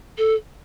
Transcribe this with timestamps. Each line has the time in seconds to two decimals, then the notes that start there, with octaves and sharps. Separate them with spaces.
0.18 A4